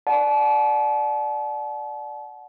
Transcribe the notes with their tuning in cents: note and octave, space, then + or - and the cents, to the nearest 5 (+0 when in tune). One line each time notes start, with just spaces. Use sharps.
D5 +0 F#5 +0 A5 -35